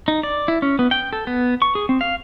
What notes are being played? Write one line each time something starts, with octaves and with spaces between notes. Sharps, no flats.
D#4
D5
E4
C#4
B3
G5
A4
B3
C#6
G#4
C4
F5